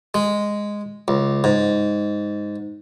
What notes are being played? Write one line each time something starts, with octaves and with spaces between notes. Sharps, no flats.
G#3
C#2
G#2